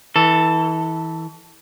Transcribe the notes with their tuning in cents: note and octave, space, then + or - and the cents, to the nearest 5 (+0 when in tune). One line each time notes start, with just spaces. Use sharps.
E3 -25 A4 +0